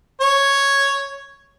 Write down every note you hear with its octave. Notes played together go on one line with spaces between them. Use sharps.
C#5